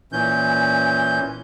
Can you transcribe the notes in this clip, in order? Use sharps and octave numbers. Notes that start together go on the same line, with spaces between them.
A#2 E3 C#4 G6